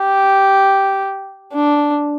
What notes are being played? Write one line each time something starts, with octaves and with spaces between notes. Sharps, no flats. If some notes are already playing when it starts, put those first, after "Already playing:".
Already playing: G4
D4